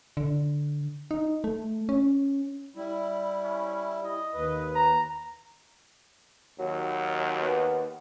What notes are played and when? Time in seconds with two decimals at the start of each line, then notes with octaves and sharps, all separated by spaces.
0.17 D3
1.11 D#4
1.44 A3
1.89 C#4
2.76 G3 E4
3.44 C#4
4.04 D#5
4.34 D#2 B4
4.75 A#5
6.59 D#2 F#3
7.41 B3